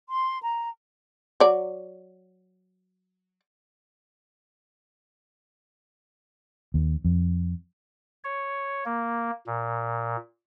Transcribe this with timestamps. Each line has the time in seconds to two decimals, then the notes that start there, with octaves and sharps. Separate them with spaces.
0.09 C6
0.43 A#5
1.40 F#3 D5
6.74 D#2
7.04 F2
8.24 C#5
8.85 A#3
9.47 A#2